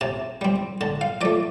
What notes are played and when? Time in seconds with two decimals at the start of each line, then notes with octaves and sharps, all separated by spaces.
0.01 C3 A5
0.41 G3 C4
0.81 D3 A5
1.01 F5
1.21 F3 A3 D5